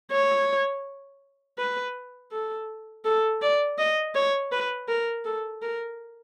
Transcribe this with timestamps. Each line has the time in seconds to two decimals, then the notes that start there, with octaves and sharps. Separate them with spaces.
0.12 C#5
1.58 B4
2.32 A4
3.05 A4
3.42 D5
3.78 D#5
4.15 C#5
4.52 B4
4.88 A#4
5.25 A4
5.62 A#4